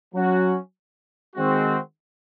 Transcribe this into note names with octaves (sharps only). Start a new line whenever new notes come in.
F#3 C#4 F#4
D#3 G#3 C4 F#4